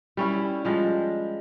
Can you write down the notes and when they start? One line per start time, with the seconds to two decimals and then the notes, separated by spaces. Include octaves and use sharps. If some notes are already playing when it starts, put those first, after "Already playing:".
0.17 G3 C#4 E4
0.65 F3 G3 G#3